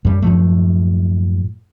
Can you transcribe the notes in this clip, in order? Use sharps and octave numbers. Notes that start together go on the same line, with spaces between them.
F#2 G3
F#2 A2 F3 A3